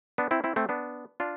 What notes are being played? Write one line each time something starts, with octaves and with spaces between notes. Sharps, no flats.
B3 D4
C4 E4
C4 E4
A3 C4
B3 D4
D4 F4